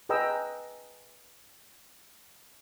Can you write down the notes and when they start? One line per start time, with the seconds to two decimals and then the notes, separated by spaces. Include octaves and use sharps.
0.09 G#4 B4 D#5 G5 A#5 E6